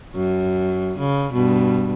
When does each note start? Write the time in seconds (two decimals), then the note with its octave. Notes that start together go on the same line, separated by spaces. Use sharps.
0.15 F#2
0.99 C#3
1.33 G2 B2